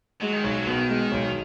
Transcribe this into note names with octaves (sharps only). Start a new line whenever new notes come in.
F#3 G#3
D#3
B1 F#3
F#3
B2 D#3
G#3
B1